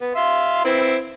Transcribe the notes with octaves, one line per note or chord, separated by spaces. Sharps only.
B3
E5 F5 C6
C4 E4 B4